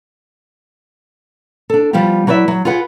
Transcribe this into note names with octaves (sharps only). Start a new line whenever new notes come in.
D4 A4
F3 G3 B3 F4 G4
F#3 E4 B4 D5 E5
F#3
F4 G#4 B4 F#5